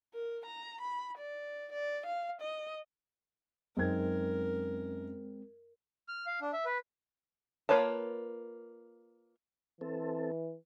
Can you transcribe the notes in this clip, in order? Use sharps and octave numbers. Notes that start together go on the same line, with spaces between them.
A#4
A#5
B5
D5
D5
F5
D#5
F#2 G#3 C4 D#4 A#4 G#6
F6
F5
D4
E5
B4
A#3 F4 B4 C#5 A5
E3 C4 A4